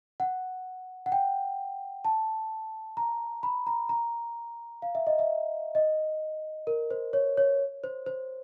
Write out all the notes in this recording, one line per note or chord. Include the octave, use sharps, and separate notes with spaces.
F#5
F#5
G5
A5
A#5
B5
A#5
A#5
F5
E5
D#5
E5
D#5
A#4
C5
C#5
C#5
C5
C5